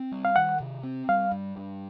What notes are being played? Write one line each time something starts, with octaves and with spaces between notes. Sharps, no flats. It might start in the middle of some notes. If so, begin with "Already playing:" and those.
Already playing: C4
G3
F5
D#3 F#5
C3
C4
G3 F5
G2
G2